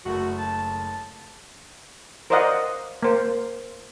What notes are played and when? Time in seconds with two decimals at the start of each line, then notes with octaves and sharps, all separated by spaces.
0.05 F#1 A3 F#4
0.38 A5
2.30 A#4 C5 D5 D#5 F5 F#5
3.03 A#3 C5